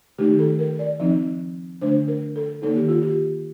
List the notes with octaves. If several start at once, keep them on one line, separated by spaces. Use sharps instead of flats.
D#3 A3 D#4 G4
A4
A#4
D5
F3 C4 D#4
D3 A3 D4 C5
A#4
A4
D#3 A#3 D#4 A4
G4
F4
G4